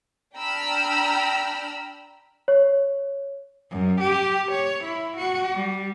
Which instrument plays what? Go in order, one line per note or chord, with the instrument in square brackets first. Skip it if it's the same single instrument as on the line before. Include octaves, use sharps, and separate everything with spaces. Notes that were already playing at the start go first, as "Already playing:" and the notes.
[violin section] D4 G5 A#5 B5 E6 F6
[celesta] C#5
[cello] F#2
G4
C#5
E4
F#4
G3